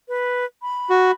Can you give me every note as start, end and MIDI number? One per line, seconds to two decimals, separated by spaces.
0.08 0.45 71
0.62 1.13 83
0.90 1.11 66